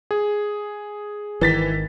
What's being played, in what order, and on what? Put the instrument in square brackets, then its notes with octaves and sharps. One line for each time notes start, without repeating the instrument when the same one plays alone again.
[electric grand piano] G#4
[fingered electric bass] G#1 D#3 [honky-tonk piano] E3 A6 B6